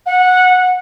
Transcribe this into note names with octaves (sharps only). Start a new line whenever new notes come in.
F#5